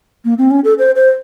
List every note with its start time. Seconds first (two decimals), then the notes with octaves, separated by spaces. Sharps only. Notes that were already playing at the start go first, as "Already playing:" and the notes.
0.25 A#3
0.38 C4
0.51 C#4
0.64 A4
0.79 C5
0.95 C5